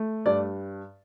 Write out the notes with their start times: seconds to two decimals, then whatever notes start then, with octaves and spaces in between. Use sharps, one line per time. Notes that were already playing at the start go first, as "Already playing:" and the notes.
Already playing: A3
0.26 G2 D5